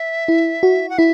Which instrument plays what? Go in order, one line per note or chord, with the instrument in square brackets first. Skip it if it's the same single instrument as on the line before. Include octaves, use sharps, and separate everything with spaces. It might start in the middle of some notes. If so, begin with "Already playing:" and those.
Already playing: [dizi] E5
[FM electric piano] E4
F#4
[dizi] F#5
[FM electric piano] E4 [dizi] E5